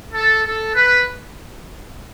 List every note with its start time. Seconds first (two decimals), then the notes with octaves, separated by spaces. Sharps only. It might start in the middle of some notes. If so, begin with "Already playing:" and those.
0.14 A4
0.44 A4
0.74 B4